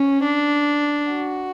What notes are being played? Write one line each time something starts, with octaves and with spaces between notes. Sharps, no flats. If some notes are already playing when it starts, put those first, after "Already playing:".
Already playing: C#4
D4
F#4